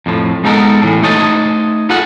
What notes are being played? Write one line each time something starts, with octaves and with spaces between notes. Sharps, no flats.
F2 A2 F3
G#3 B3 D#4 A4 A#4
A2 E3
A3 D#4 C5 C#5 D#5 A5
B3 F4 G#4 A4 F#5